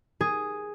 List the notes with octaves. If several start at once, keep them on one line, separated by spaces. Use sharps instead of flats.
G#4